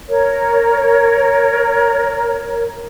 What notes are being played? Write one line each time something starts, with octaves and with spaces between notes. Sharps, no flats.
A#4 C#5